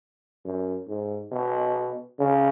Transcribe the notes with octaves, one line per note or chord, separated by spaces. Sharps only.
F#2
G#2
B2
C#3